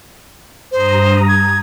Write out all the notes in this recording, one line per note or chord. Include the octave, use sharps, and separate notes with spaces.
G2 C5 A#5 D#6
G#6